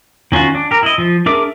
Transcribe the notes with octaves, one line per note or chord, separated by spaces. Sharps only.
D#3 C#4 F4 F#4
D4
G4 A#4
E4 D#5
F3
D4 G#4 A#4 E5 D6